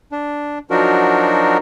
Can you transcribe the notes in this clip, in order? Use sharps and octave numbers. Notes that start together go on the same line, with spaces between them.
D4
F3 F#3 D4 D#4 F#4 A#4